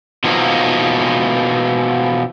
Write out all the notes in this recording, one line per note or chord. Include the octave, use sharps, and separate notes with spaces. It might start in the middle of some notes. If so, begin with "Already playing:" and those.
B2 E3 F3 A#3 D#4